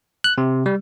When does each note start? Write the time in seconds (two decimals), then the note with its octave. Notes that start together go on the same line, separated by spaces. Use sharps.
0.24 F#6
0.38 C3
0.66 G3